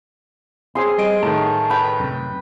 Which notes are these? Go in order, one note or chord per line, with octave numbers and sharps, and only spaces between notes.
C4 C#4 G#4 C6
G3 D#5 D7
A2 D#3 A5
B4 G5
F#2 C3